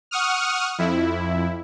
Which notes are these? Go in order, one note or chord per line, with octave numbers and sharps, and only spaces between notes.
F#5 C#6 D#6 F6
F2 E4